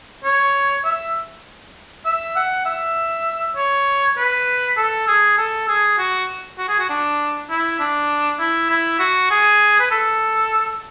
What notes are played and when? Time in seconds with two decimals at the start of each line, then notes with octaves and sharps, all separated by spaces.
0.24 C#5
0.84 E5
2.05 E5
2.36 F#5
2.65 E5
3.56 C#5
4.17 B4
4.77 A4
5.07 G#4
5.38 A4
5.68 G#4
5.98 F#4
6.58 F#4
6.68 G#4
6.79 F#4
6.89 D4
7.49 E4
7.79 D4
8.39 E4
8.69 E4
8.99 F#4
9.30 G#4
9.79 B4
9.91 A4